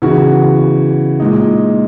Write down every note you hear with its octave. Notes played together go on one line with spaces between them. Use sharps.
C#3 E3 B3 F#4
A#2 G#3 D#4